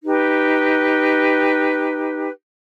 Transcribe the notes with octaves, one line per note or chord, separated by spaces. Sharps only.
D#4 G4 B4